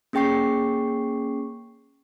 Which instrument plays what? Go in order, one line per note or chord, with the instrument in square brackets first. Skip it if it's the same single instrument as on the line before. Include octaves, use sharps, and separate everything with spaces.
[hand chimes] A#3 C#4 G#4 G5 C#6 C7